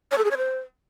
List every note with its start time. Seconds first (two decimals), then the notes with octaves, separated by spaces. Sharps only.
0.11 C#5
0.18 A4
0.24 G#4
0.31 C#5
0.37 C5